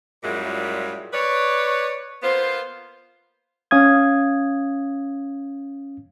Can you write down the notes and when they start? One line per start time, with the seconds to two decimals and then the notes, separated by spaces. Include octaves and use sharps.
0.24 F#2 A#2 G3 G#3 E4 F4
1.13 B4 C#5 D5
2.23 A#3 B3 F4 C5
3.71 C#4 F5 D#6 G#6